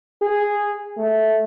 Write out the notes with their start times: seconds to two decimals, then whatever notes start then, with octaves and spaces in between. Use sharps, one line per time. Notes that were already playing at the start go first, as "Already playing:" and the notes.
0.22 G#4
0.98 A3